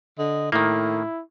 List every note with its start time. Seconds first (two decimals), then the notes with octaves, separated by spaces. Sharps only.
0.19 D3 D#5
0.52 A2 D#3 A#3 E4